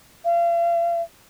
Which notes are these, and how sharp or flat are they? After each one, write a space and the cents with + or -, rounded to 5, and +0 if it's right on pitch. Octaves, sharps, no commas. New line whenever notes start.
F5 -40